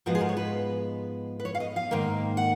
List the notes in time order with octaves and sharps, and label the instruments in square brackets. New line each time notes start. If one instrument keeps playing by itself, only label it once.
[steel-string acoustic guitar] G#2 F3 G#3 B3 F#4
G#4
A#4
C#5
B4
B4
C#5
F5
D#5
F5
G#2 D#3 A#3
F#5